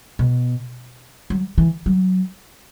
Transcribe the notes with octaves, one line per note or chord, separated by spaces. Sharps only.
B2
F#3
E3
F#3